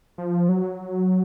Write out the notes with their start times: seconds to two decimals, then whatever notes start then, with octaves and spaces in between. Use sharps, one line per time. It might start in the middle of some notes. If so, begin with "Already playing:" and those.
0.18 F3
0.49 F#3